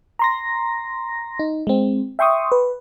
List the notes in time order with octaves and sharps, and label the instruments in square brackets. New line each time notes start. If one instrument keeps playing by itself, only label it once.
[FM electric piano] A#5 C6 A#6
D#4
G#3 C4
E5 G5 C6 C#6 D#6
B4